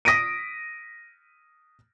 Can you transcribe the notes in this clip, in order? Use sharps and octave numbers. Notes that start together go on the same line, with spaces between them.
D#6 A#6 B6 D7 D#7